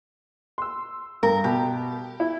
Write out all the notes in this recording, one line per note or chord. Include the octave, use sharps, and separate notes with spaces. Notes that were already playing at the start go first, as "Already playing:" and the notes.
C6 E6
G2 A#4
B2 G4
E4